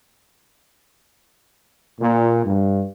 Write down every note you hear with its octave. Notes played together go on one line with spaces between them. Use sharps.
A#2
G2